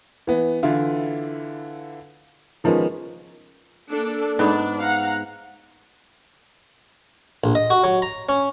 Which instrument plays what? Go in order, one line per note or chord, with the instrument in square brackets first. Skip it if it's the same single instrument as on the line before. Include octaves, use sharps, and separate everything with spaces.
[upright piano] E3 B3
D3 E3 E4 F4
D#3 F3 G#3 A#3 B3 C#4
[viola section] A#3 D4 A4
[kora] G#2 B3 [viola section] D4
[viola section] F5 F#5 A#5
[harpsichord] A#1
D#5
F#4
F#3
A#5
C#4